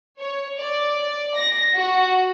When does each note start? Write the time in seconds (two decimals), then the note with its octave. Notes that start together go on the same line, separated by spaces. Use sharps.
0.18 C#5
0.57 D5
1.35 A#6
1.74 F#4